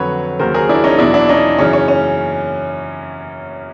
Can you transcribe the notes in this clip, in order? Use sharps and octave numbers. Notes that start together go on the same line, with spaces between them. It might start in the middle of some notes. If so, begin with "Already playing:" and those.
Already playing: F2 D3 F#3 B4 C#5
D#2 C#3 F#3 A#4 C5
G#4 A#4
D4 E4
C#4 D#4
E2 B2 F#3 D4 E4
D4 E4
C#4 D#4
F#2 C#3 E3 C#4
C#4
C#4